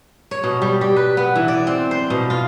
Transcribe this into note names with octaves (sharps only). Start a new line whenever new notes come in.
C#5
B2
G3
G4
B4
B3
E3
D5
C4
C5
B2
F4